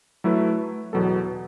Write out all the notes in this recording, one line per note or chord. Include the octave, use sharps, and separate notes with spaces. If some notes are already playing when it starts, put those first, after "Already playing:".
F#3 A3 E4 B4
E2 B2 F#3 B3 A4